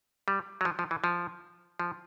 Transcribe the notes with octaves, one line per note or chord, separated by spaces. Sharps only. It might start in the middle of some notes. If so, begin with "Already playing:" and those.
G3
F#3
F3
F3
E3
F3
F3